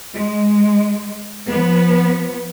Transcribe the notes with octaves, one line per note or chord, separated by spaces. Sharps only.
G#3
F3 B3